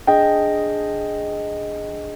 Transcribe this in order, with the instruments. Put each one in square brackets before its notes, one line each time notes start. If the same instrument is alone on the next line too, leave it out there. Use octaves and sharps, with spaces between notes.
[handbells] D4 G#4 D#5 [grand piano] G5